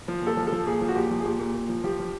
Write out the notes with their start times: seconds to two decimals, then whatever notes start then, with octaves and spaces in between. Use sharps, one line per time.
0.08 F3
0.22 A#2 A4
0.37 F3
0.47 A4
0.52 F3
0.66 A#2 G#4
0.81 F3
0.88 F#4
0.95 A#2 G4
1.11 F3
1.20 G#4
1.25 A#2 G4
1.40 A#2
1.54 A#2
1.69 F3
1.84 F3 G4
1.99 F3